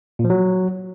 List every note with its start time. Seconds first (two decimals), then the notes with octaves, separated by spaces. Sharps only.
0.19 A#2
0.25 F3
0.30 F#3